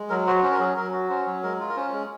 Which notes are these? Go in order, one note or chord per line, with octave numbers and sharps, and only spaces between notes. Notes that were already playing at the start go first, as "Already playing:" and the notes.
Already playing: G#3
F#3 A#4
F#4 C5
C#4 C5
A#4
F#3 G#4
F#3 A#4
F#4
C#4 C5
F#3
G#3 A#4
F4
A#4
C#4 C5
G#3